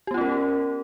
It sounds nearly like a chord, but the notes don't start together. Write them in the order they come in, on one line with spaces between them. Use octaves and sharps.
G4 B3 F4 C#4 A#4